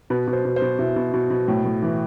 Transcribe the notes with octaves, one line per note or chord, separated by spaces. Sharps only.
B2 B4
B2
C5
B2
C5
B2
B2 E4
B2
B2
B2
A2
A2
E3